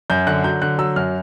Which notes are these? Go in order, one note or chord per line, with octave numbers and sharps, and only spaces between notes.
F#2 G6
D3 F#6
F#3 G6
D3 F#6
F#3 E6
F#2 F6